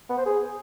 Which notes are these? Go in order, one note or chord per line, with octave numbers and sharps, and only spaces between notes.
B3
C5
G#4